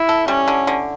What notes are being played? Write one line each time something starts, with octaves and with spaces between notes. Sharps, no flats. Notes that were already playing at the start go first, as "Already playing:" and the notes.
Already playing: E4
A4
G3 C#4
D3
D3